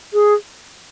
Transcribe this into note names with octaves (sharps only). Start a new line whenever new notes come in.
G#4